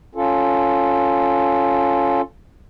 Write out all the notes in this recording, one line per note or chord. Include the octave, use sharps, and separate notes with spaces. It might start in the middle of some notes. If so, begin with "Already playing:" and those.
C#4 F4 A4